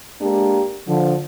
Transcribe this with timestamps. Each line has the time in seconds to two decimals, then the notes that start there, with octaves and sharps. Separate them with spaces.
0.21 G#3 A#3 D4 G4
0.88 D3 F3